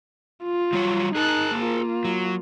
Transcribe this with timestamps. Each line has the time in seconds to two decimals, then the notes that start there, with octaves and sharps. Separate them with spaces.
0.44 F4
0.73 F#3 G3 C#5
1.15 D#4 G#4 A#4 A5 F#6
1.55 A#3 F4
2.05 F#3